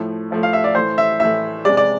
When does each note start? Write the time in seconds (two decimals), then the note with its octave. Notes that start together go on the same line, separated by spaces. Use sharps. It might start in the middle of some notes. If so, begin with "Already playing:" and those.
Already playing: A2 F3 A3
0.30 A2 F3 A3
0.43 F5
0.53 E5
0.64 D5
0.75 A2 E3 A3 C5
0.98 E5
1.20 A2 E3 A3 E5
1.65 C3 G#3 D5
1.77 D5